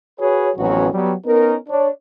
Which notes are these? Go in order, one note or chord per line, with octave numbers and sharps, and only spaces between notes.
F#4 G#4 B4 C#5
A1 F2 F#3 B3 C#4 F#4
F#3 G3 B3
B3 C#4 D#4 A#4
D4 C#5